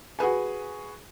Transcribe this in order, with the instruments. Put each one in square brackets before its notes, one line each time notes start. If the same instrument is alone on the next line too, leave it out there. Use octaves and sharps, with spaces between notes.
[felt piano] F#4 G#4 B4 G#5